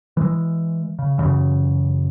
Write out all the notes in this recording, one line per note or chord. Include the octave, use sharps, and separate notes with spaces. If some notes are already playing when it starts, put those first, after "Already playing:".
E3 G#3
C#3
F#2 C#3 E3